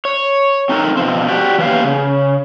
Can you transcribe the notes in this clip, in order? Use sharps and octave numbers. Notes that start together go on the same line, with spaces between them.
C#5
C4 D#4 A4 A#4
B2 F3 C4
F#4 G4 D5
E3 A#3 B3 C#4 G4 F5
C#3